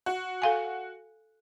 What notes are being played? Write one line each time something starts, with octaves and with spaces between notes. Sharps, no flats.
F#4
A4 F5 G#5